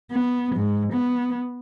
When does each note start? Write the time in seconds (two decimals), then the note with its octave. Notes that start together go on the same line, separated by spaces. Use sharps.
0.11 B3
0.55 G#2
0.93 B3